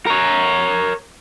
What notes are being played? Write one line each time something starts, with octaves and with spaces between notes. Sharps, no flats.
A#4 C#5